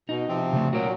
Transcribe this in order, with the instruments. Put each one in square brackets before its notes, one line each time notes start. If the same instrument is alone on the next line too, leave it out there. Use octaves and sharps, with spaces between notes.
[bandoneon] B2 [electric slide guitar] D#4
[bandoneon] C3 F3 C4
[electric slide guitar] C#3 A3
[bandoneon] A#2 F#3 [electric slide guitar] F#4 A#4